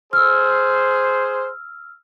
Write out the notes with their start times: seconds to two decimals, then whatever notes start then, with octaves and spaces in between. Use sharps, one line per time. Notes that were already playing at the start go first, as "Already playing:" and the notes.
0.13 G#4 C5 E6 F6